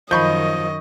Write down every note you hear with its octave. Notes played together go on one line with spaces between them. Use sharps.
F#2 D#3 F3 D#5 B5 C#6 G6